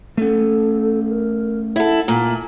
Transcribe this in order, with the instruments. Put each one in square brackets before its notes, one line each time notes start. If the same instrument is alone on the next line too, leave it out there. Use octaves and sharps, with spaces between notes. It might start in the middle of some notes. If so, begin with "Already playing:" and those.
[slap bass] A3 C#4 [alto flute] A4
[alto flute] A#4
[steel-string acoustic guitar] E4 A4 [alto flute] F#5
[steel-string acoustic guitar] A#2 [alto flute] G#5